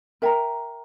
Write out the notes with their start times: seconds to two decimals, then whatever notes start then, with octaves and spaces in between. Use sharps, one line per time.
0.22 A#4 E5 G5 A#5